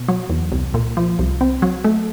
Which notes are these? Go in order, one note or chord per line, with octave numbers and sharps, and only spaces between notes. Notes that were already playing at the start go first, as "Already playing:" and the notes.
Already playing: B2
F#3
E2
C2
A#2
F3
C2
C4
F#3
A3